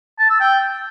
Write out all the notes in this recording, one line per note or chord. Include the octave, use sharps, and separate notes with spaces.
A5
E6
G5